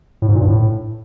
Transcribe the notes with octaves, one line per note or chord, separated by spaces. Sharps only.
A2
G#2
A#2
G2
A2